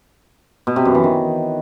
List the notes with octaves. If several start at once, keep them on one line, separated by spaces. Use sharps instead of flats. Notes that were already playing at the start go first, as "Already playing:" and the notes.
B2
C3
F#2
E3
D#3